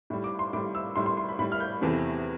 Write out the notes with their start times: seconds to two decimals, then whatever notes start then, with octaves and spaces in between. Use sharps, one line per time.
0.10 A2 G3
0.24 D6
0.39 C6
0.53 A2 D6
0.56 G3
0.75 E6
0.96 A2 G3 C6
1.06 C6
1.17 C6
1.29 B5
1.39 A2 B5
1.42 G3
1.52 F6
1.60 G6
1.81 E2 C3 E3 A3